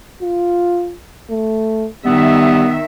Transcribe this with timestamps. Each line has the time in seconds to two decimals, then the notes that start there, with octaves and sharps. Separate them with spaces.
0.22 F4
1.30 A3
2.05 D#3 G3 B3 E5